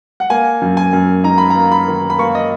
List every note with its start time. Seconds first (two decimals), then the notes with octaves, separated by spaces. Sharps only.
0.20 F#5
0.30 A#3 G#5
0.61 F#2
0.77 G#5
0.93 F#2
1.24 D#4 A#5
1.38 B5
1.50 A#5
1.55 A#3
1.71 B5
1.88 D#3
2.10 B5
2.18 A#3 C#6
2.35 D#5